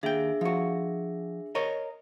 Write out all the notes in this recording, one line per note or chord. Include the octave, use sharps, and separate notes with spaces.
D#2 D4 G#4 E5 G5
F3 F#4
A#4 C#5 D#5